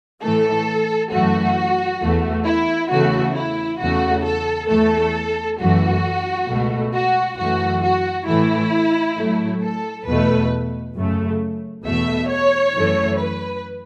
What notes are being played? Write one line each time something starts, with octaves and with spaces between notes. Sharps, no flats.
A2 E3 A3 A4
F#2 E3 A3 F#4
E2 E3 A3
E4
E2 C#3 E3 A3 F#4
E4
E2 C#3 A3 F#4
A4
E2 E3 A3 A4
F#2 E3 A3 F#4
C#2 B2 A3
F#4
F#2 E3 A3 F#4
F#4
A2 E3 A3 E4
A2 F#3 A3
A4
E2 B2 A3 B4
F#2 C#3 A3
E2 B2 A3 E5
C#5
F#2 E3 A3
B4